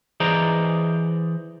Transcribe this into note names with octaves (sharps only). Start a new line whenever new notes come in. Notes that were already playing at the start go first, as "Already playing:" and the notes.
E3 G#4 C5 D5 D#5 A#5